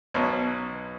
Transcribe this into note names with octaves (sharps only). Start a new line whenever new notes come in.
B1 B2 F#3